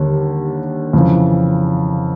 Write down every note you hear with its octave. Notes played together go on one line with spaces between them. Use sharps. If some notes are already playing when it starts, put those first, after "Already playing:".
Already playing: D#2 D3 G3
F2 C#3 E3